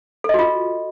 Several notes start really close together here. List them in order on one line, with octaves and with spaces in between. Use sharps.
A4 D#5 F#4 F4